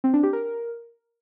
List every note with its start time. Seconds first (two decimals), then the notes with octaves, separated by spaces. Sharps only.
0.04 C4
0.14 D4
0.23 G4
0.33 A#4